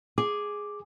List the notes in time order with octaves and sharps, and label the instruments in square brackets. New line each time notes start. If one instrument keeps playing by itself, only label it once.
[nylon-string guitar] G#4 [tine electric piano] D6